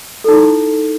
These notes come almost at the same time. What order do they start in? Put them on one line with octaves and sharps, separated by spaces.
A4 D#4 E4